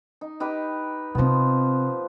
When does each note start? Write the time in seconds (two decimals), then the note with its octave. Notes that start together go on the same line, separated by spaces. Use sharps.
0.21 D#4
0.40 D#4 G4 B4
1.15 C3 F3 B3 C4